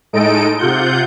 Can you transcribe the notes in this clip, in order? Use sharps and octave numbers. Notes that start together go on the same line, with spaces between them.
A2 G#3 D#4 A4 D#5 D7
C3 F4 F#5 G6